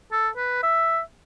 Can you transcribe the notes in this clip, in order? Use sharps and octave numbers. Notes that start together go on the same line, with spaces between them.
A4
B4
E5